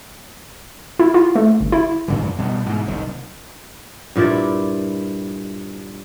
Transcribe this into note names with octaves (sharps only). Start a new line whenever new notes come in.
E4
F4
A3
G1
E4
A2 C#3 E3
F#2
B2 G3 G#3 B3
G#2 B2 E3
F#1 C2 D#3
G2 A#2 E4 D5